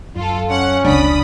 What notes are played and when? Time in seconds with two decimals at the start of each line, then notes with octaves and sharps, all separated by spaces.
0.16 F#2 F4 A4
0.51 C#4 F#5
0.85 F1 C#2 D4 B5 D#6